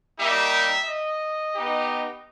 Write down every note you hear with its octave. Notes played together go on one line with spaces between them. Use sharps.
G3 A#3 D#4 G4 E5
D#5
B3 D#4 G4